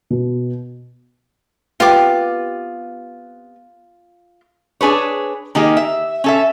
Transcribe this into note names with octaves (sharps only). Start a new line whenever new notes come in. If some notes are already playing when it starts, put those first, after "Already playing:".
B2
B3 C4 F4 G4 D6
D4 G#4 B4 C#5
D#3 A#3 D#4 G4 G#4
E5
C#4 A4 E5